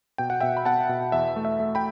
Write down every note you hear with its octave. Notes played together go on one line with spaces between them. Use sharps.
B2 G5
F#5
B2 E5 G5
B5
B3 F#5 A5
B2
E2 E5
A3
E5
A3
G5 B5